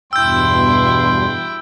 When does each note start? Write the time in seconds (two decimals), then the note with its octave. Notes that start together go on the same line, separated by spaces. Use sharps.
0.13 E2 G2 B2 E4 G5 C6 E6 G6